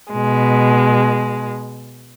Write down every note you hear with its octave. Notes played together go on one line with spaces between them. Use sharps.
B2 G#3